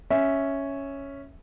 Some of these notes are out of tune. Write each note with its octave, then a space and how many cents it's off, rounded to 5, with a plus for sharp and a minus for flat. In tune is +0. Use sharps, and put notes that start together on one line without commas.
C#4 +0 E5 -5